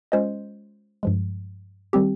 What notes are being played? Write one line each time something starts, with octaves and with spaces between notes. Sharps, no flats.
G#3 C#4 F4 C5 D#5
G2 F3 G#3
D#3 G3 C4 G4